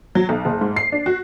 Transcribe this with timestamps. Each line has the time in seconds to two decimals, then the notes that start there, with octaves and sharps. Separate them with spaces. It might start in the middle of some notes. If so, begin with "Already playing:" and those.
0.15 F#3
0.29 B1
0.45 F#1
0.61 G#2
0.76 C7
0.92 D4
1.06 F#4